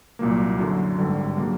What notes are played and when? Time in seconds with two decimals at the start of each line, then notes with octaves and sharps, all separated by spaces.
0.19 C2 A#2 F#3 A#3
0.59 F#2 D3 F#3
0.98 G#1 G2 D3 G3
1.37 C#3 F#3 A#3